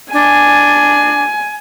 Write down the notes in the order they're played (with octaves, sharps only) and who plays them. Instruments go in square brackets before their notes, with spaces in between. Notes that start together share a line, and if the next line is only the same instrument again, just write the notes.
[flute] D4 [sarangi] G#5